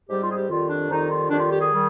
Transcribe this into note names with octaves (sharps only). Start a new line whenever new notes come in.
G#2 G3 C4 G4
F4
G#4
G4
F2 D#3 G3 F4
D4
F2 D#3 G3 D#4
F4
F2 D#3 G3 D4
F4
G4
G#4
D#3 G3